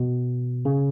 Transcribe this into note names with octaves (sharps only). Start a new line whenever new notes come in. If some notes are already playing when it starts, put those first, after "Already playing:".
Already playing: B2
C#3